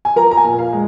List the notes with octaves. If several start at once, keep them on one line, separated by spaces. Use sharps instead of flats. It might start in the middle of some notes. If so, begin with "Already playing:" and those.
G#5
F3 A#4 A#5
A#5
G#5
A#2
F5
G#3